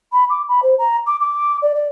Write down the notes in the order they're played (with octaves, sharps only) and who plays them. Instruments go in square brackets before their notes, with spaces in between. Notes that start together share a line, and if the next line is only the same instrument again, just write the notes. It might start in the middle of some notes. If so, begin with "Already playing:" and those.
[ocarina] B5
D6
B5
C5
A#5
D6
D6
D5
D5